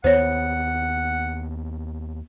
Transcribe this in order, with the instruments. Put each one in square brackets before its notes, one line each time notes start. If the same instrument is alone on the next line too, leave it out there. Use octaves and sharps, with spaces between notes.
[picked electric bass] D#2 B3 [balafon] C5 C#5 [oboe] F#5